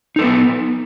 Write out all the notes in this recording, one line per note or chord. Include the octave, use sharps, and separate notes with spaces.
B3 D#4 A4 B4